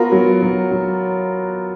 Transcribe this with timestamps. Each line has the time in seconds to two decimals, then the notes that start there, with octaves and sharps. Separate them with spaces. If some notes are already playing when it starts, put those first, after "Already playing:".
Already playing: B3 F4 F#4 A#4
0.12 F#3
0.42 F#3
0.71 F#3